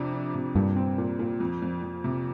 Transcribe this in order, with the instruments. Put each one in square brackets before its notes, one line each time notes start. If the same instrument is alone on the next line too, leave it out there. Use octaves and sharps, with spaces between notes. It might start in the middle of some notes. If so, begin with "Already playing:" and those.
Already playing: [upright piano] F2 C3 D4
D4
C3
[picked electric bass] G2 [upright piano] A#2
[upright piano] C4
A#2
A#2
F2
F2
F2
C3